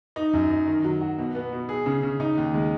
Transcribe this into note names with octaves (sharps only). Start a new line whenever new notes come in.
D#4
F#2
D#4
D#3
F#3
F#4
B2
B3
B2
G#4
C#3
C#3
D#4
D#2
G#3